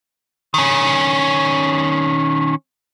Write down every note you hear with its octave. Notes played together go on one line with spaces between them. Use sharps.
D#3 C#4